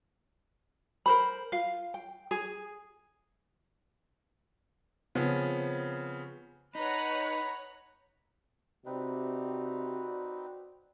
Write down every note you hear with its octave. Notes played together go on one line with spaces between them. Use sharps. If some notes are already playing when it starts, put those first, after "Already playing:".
A#4 C5 B5
F4 F5
G5
G#4
C#3 F3 B3 C4
D#4 B4 C#5 F#5 A#5 B5
C3 C4 D#4 F#4 B4 D5